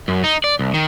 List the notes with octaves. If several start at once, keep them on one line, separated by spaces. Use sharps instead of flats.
F#2
D#4
D5
C2
D#3